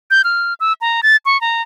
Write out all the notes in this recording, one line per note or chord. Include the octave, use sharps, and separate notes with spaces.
G6
F6
E6
A#5
A6
C#6
A#5